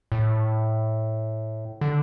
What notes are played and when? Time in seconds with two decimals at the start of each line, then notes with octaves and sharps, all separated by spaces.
0.12 A2
1.81 D3